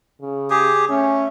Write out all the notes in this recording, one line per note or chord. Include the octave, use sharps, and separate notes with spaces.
C#3
G4 G#4
A3 C#4